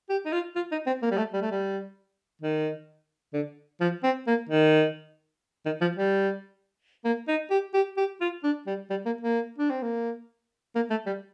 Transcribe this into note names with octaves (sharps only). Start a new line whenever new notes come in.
G4
D#4
F4
F4
D#4
C4
A#3
G3
A3
G3
A3
G3
D#3
D3
F3
C4
A#3
D#3
D#3
F3
G3
A#3
D#4
G4
G4
G4
F4
D4
G3
G3
A#3
A#3
D4
C4
A#3
A#3
A3
G3